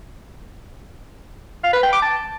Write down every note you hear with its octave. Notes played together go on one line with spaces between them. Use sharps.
F5
B4
G5
D6
A5